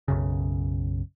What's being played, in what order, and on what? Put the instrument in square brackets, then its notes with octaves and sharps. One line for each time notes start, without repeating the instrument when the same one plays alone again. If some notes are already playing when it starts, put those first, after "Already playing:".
[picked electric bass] B1 F#2 C#3